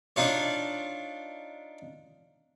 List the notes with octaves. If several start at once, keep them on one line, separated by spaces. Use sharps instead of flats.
D4 D#4 F4 C#5